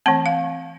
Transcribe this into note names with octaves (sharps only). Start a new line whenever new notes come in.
E3 A3 C4 A5
F5